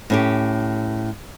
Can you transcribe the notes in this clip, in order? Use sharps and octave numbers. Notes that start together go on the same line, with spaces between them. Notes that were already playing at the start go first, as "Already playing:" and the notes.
A2 C#4 G4